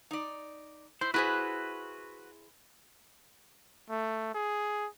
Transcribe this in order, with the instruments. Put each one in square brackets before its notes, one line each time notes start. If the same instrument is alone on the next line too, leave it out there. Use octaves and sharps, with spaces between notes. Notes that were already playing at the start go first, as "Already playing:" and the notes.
[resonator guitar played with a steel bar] D#4 D5
[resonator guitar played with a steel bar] E4 [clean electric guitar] C5
[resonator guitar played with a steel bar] E4 G#4 C5 [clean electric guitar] F#4 B4
[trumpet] A3
G#4